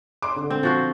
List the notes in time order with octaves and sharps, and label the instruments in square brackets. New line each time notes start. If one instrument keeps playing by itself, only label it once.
[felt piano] D5 C6 D6
D3
[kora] C4
F3 F#4 C5